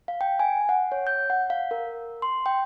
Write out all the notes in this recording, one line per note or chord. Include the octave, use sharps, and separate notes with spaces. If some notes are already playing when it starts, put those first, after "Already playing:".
F5
G5
G#5
F#5
C#5
G6
F#5
F5
A#4
C6
G5